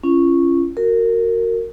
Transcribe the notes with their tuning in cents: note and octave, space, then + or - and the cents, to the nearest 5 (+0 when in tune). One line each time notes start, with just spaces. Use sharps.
C#4 -10 F4 -40
F#4 +0 A#4 -20